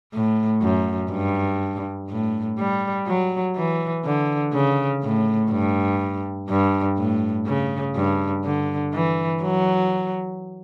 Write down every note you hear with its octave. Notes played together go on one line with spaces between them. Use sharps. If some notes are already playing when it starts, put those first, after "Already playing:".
A2
F#2
G2
A2
G3
F#3
E3
D3
C#3
A2
G2
G2
A2
C#3
G2
D3
E3
F#3